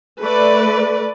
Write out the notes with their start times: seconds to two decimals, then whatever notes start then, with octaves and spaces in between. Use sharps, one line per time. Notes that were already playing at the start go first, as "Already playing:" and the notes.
0.22 A3 B4 D5